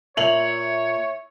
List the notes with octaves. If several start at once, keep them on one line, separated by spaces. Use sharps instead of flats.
A#2 C#5 E5 F7 F#7